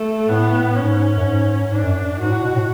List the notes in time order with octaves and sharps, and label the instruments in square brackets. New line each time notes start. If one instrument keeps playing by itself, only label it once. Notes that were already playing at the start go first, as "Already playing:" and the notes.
Already playing: [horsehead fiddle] A3
[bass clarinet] A2 [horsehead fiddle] B3
[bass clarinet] G#2 [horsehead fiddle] C#4
[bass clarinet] F#2
G#2
[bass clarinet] G#2 [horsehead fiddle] D4
[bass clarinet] F#2
F#2
[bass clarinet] G#2 [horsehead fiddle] F#4
[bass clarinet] A2
B2
A2